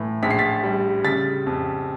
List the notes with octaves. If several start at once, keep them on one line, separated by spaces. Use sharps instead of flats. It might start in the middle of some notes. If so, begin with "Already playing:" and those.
Already playing: A2 E3
A#1 B6
C7
A6 B6
G3
C#3 A6 B6
F2